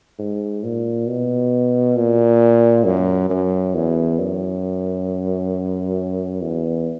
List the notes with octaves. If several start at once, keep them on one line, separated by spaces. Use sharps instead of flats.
G#2
A#2
B2
A#2
F#2
F#2
E2
F#2
E2